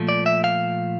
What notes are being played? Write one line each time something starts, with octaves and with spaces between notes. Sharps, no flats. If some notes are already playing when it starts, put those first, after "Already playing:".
Already playing: A#2 F3 A3
D5
E5
F5